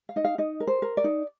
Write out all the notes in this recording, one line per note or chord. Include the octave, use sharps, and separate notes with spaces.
F5
D#4 D#5
F5
D#4 D#5
A#4
C5
A#4
D5
D#4